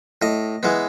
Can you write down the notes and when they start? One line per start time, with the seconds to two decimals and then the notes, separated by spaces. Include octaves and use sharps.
0.22 A2 D#5
0.63 E3 G#3 B3